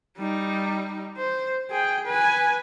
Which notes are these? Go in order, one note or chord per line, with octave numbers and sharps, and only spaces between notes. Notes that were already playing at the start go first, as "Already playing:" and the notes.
G3 D#4
C5
G#4 G5
B4 G#5